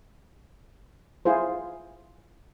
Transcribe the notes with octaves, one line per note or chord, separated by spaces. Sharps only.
E4 F4 G#4 C5